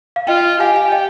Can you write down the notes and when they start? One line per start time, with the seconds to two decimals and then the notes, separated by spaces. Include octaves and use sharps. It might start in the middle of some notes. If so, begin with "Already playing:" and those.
0.16 F5
0.27 F4 D#5 G5
0.60 G4 F5 G#5
0.76 F5 G#5
0.92 D#5 G5